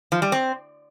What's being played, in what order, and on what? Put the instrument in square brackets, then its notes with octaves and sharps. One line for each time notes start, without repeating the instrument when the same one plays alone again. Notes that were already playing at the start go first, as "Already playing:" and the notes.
[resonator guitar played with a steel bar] F3
G3
C4